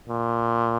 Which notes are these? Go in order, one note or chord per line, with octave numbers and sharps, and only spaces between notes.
A#2